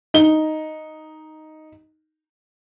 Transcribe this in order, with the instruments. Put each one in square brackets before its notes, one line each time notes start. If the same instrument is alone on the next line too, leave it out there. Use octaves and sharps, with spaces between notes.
[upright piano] D#4 G7